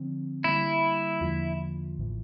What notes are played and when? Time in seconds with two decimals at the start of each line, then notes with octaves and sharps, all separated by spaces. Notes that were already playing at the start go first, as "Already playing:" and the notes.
Already playing: D3 F3 C4
0.44 D3 G3 A#3 E4
1.21 E2 D3 F3 A#3 F4
1.97 A1 A2 E3